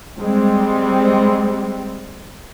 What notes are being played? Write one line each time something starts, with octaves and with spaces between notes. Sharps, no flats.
G3 G#3 C4